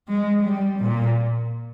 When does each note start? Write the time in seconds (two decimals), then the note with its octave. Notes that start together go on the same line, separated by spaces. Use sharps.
0.09 G#3
0.45 G3
0.80 A#2